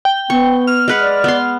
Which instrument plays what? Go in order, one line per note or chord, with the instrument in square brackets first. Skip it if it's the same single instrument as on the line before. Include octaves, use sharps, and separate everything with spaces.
[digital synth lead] G5
[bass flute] B3 [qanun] C#6
[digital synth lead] F6
[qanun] G#3 B4 F#5
[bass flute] D5
[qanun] B3 C6